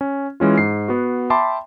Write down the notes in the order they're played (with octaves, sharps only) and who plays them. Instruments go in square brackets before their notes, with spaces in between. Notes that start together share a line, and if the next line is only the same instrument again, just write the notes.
[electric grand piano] C#4
E3 G#3 C#4 F4
G#2 C7
B3 F#4
E5 G5 A5 B5 C6 D6